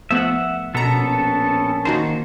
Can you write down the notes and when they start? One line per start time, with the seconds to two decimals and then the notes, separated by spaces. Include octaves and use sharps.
0.11 F3 A3 B3 E5 F#5
0.75 A#1 B2 B3 C#4 A4 A5 A#5
1.85 D#3 A#3 D#4 F#4 C5